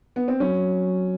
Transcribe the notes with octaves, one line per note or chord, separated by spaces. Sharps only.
B3
C4
F#3 C#4